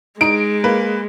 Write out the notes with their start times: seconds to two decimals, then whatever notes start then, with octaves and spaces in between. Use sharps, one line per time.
0.21 G#3 D#4 D7
0.64 A#3 B4